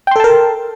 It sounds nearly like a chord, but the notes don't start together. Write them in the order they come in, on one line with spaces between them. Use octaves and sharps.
G5 C6 A4 A5 A#4